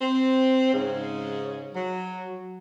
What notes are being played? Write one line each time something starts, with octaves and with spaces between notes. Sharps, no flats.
C4
G#2 C#3 G#3
F#3